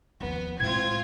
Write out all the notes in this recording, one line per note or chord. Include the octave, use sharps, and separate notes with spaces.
D#2 F3 B3
A2 G#3 C4 F4 G#6